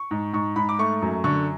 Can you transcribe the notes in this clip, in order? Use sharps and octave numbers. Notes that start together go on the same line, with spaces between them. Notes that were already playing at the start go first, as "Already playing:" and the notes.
Already playing: C#6
G#2
G#2 C#6
G#2 B5
D6
A3 C#6
F#2
D3 C#6